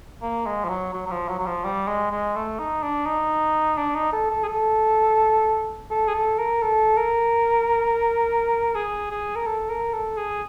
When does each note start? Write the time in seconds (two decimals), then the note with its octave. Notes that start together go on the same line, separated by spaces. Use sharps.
0.22 A#3
0.46 G#3
0.65 F3
0.69 F#3
0.93 F#3
1.06 F#3
1.11 F3
1.28 F#3
1.39 F#3
1.46 F3
1.64 G3
1.88 G#3
2.12 G#3
2.35 A3
2.59 D#4
2.82 D4
3.06 D#4
3.78 D4
3.95 D#4
4.13 A4
4.31 A4
4.44 G#4
4.48 A4
5.91 A4
6.08 G#4
6.14 A4
6.38 A#4
6.62 A4
6.97 A#4
8.75 G#4
9.11 G#4
9.36 A#4
9.46 A4
9.70 A#4
9.93 A4
10.17 G#4